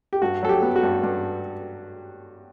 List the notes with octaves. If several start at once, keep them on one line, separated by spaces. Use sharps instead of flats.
G4
G2 F#4
F#3 A4
G4
B3
F#4
G2
G2